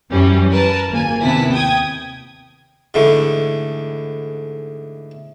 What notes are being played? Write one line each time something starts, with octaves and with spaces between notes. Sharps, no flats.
F#2 E3 G3 C#4
A#4 B4 A5
G#1 A#3 G#5
D#2 C3 B3 E4 A5 B6
G5 D#6 G#6
G#2 D3 E3 A3